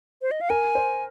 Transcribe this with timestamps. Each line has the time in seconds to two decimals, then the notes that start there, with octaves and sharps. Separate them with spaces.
0.22 C5
0.31 D#5
0.41 F5
0.50 A#4 G#5
0.75 C5